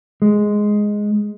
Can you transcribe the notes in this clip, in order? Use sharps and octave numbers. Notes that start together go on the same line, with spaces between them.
G#3